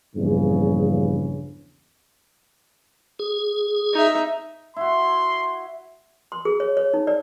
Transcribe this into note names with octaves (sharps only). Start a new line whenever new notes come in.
A#1 E2 G2 C#3
G#4
D#4 E5
E4 F#4 C6
C6
G#4
C#5
C#5
D#4
D5